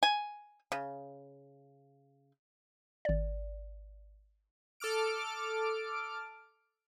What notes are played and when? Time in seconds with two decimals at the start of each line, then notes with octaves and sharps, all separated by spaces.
0.03 G#5
0.72 C#3
3.05 G#1 D5
4.80 A4 D6 F6 D7